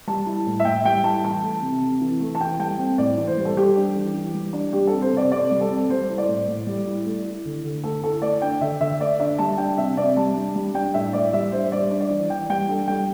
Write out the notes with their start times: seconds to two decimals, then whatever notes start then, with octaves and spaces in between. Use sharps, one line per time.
0.07 G3 A5
0.26 E4
0.47 A2
0.60 E5
0.65 A2 G5
0.85 G3 G5
1.04 E4 A5
1.23 E3 A5
1.43 A3
1.62 C3
1.81 C3
2.01 E3
2.20 A3
2.35 A5
2.40 E3 G5
2.59 G3 G5
2.79 C4
2.98 A2 D5
3.17 E3
3.27 C5
3.37 G3
3.45 A4
3.57 G3 G4
3.76 D4
3.95 E3
4.14 E3
4.34 G3
4.53 D4
4.73 G3 G4
4.87 A4
4.93 C4
5.02 C5
5.12 C3 D5
5.32 C3 D5
5.51 G3
5.61 A4
5.71 C4
5.89 G3 C5
6.09 E4
6.18 D5
6.28 A2
6.48 A2
6.67 G3
6.87 E4
7.06 A3
7.25 E4
7.45 D3
7.64 D3
7.84 A3 A4
8.03 E4 A4
8.22 A3 D5
8.42 D4 G5
8.61 D3 E5
8.81 D3 E5
9.00 A3 D5
9.20 D4 E5
9.38 G3 A5
9.58 D4 G5
9.78 C3 E5
9.97 C3 D5
10.16 G3 A5
10.36 D4
10.55 G3
10.75 D4 G5
10.94 A2 E5
11.13 A2 D5
11.33 G3 E5
11.52 D4 C5
11.72 G3 D5
11.91 D4
12.00 D5
12.10 E3
12.30 E3 G5
12.49 G3 G5
12.68 D4 A4
12.88 G3 G5